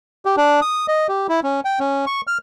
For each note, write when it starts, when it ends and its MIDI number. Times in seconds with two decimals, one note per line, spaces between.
0.25 0.36 67
0.37 0.60 62
0.62 0.86 87
0.88 1.07 75
1.09 1.27 67
1.29 1.40 64
1.44 1.60 61
1.65 1.79 79
1.80 2.05 61
2.07 2.21 85
2.27 2.38 89